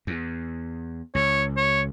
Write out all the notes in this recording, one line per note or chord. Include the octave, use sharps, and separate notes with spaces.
E2
C#2 C#5
C#5